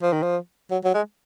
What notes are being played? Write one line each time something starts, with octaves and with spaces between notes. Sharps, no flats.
F3
D#3
F3
F#3
F#3
G#3